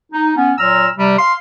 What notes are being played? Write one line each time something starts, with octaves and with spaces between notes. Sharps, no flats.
D#4
B3 C#4
A#2 F#3 A#5 E6 F6
C3 G3
F5 C6